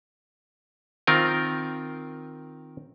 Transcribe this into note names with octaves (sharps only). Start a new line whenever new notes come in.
D#3 C4 F4 A#4